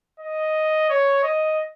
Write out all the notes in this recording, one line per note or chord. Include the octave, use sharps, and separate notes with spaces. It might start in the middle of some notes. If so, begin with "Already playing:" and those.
D#5
C#5
D#5